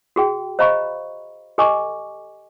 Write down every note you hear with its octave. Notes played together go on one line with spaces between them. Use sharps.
F#4 G#4 G5
C5 D#5 F5 A#5 B5 C#6
G4 A4 D#5 G#5 C#6 D6